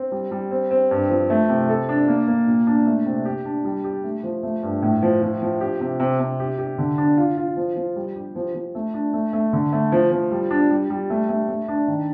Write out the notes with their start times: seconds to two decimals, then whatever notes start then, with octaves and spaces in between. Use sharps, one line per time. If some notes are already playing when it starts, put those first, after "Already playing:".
Already playing: C4
0.12 G3
0.31 G3
0.51 C4
0.71 C4
0.91 G2
1.10 F3
1.30 A3
1.49 C3
1.69 A4
1.89 D4
2.08 A#3
2.28 A#3
2.47 A#2
2.67 D4
2.86 A3
3.06 C3
3.25 G4
3.45 D4
3.65 G3
3.84 G4
4.04 A3
4.23 F3
4.43 A3
4.63 G2
4.82 A2
5.03 F3
5.22 F3
5.42 F3
5.61 G4
5.80 C3
6.00 C3
6.20 C3
6.40 G4
6.59 G4
6.78 D3
6.98 D4
7.17 F4
7.37 F4
7.57 F3
7.76 F3
7.96 G3
8.16 G4
8.36 F3
8.55 F3
8.75 A3
8.94 D4
9.14 A3
9.33 A3
9.53 D3
9.73 A3
9.92 F3
10.11 F3
10.31 G3
10.51 D4
10.70 G3
10.90 G3
11.10 A3
11.29 A3
11.48 A3
11.68 D4
11.88 D#3